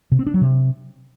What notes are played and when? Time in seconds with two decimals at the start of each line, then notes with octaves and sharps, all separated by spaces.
0.12 C3
0.19 C4
0.27 D4
0.34 F#3
0.41 C3